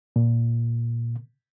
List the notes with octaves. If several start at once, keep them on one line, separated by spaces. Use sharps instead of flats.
A#2